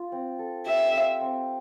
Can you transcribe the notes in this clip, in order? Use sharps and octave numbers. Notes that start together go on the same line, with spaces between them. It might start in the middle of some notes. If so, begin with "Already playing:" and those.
Already playing: F4
C4
A4
G4 E5
F5
C4